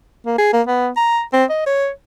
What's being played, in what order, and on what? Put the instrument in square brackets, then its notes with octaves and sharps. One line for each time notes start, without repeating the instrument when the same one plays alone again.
[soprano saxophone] A#3
G#4
A#3
B3
A#5
C4
D#5
C#5